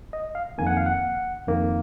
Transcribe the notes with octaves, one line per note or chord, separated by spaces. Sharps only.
D#5
F5
F2 D#3 A#3 G#5
F#5
F5
F#5
F2 D#3 A#3